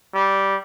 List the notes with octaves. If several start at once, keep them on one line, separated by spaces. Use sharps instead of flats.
G3